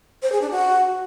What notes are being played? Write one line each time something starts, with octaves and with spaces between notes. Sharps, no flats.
C5
G#4
D4
F#4